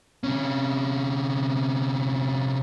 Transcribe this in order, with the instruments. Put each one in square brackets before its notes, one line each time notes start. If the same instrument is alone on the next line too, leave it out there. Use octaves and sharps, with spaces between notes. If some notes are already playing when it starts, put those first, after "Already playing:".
[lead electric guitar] C3 C#4